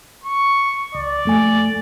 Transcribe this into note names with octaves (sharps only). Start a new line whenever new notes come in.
C#6
C#2 D5
F2 A3 G#5